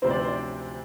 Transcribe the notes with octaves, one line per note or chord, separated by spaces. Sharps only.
D2 C3 F3 C4 C5
D5
C5
D5